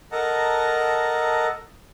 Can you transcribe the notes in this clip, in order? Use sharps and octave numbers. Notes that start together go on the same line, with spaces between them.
A4 A#4 D#5 F#5 A5 A#5